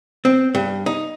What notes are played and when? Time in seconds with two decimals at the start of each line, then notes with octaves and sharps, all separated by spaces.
0.25 C4
0.55 G2
0.86 D#4